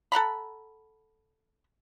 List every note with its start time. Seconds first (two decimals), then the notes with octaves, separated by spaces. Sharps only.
0.12 A4 F#5 A#5 B5